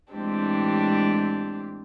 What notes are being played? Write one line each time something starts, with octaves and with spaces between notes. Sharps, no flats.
A2 E3 G#3 C4 D4 G4